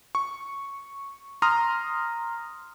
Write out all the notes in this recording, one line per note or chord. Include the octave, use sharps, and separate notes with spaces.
C#6
A#5 C6 D#6 F6